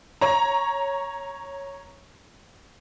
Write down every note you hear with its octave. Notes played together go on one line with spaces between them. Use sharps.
C#5 A#5